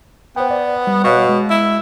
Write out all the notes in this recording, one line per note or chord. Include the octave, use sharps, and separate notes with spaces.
B3 C5 G5
D5
G3
B2 C#5 F5 C#6
G#3
E4